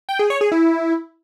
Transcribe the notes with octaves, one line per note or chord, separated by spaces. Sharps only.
G5
G#4
C#5
G#4
E4